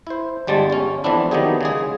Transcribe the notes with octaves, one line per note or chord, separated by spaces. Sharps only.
E4 C5
G1 G3 G#3 A5
G1 G3 C#4
F2 E3 B3 C4 D4 E4
D#3 F#3 B3 E4 G4 G#4
C#3 G#3 G#4